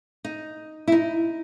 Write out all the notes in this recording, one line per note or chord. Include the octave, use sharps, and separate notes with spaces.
D#4
E4
D#4